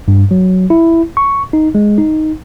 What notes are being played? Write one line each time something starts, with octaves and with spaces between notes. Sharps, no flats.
G2
F#3
E4
C#6
D#4
G#3
D#4